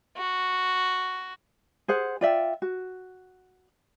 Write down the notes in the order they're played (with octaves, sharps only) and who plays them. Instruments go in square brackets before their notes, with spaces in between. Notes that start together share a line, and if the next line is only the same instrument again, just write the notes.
[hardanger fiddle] F#4
[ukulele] G#4 C5 F#5
F4 D5 E5 G5
F#4